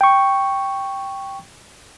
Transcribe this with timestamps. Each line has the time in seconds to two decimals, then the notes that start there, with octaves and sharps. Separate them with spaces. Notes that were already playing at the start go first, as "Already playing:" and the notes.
0.01 G5 C#6